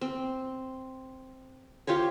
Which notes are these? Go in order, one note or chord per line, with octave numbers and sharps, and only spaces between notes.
C4
F4 G4 C5 C#5